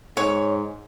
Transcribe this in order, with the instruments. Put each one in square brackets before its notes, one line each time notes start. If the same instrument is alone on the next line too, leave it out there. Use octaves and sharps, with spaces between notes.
[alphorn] G#2 [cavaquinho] C#5